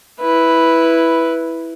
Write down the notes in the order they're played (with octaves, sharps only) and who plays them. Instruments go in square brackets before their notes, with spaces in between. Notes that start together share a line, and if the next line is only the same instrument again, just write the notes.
[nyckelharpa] E4 B4